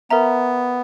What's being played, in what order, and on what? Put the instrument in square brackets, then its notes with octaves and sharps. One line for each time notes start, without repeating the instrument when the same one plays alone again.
[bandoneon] B3 [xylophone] A#4 E5 A#5